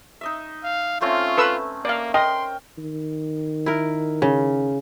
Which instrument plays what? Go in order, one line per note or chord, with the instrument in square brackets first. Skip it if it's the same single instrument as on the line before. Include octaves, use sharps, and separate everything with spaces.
[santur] D#4 D#5 E5
[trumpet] F5
[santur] A3 C4 C#4 [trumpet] F4
[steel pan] A4 B4 E6
[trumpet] A#3 [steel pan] D5 F5
[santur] A#4 [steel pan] D#5 [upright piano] G5 [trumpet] C6
[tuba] D#3
[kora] E4 A#4
C#3